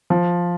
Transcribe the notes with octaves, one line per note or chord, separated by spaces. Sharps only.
F3